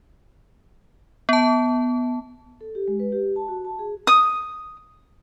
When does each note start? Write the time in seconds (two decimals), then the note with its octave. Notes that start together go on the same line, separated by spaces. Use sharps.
1.29 B3 A5
2.61 A4
2.75 G4
2.88 G#3
2.99 B4
3.12 G4
3.36 A5
3.48 F#4
3.65 A5
3.79 G#4
4.07 D#6